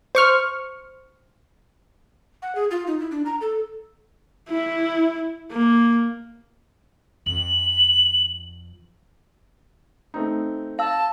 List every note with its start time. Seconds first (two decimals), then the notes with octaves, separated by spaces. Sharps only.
0.15 C5 C#6 F6
2.42 F#5
2.55 G#4
2.71 F4
2.87 D#4
3.00 E4
3.11 D4
3.26 A#5
3.41 A4
4.49 E4
5.51 A#3
7.26 F2 F#7
10.14 A3 C4 D#4
10.79 F5 A5 E6